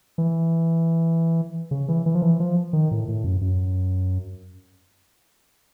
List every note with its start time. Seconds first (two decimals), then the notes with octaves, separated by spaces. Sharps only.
0.18 E3
1.71 C#3
1.88 E3
2.06 E3
2.15 F3
2.22 E3
2.40 F3
2.73 D#3
2.91 A2
3.08 A2
3.24 F#2
3.41 F#2